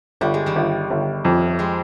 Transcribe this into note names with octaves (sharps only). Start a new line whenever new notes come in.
G1 G3
G#3
D#3 G3
G1
G1
F2
G#3 C4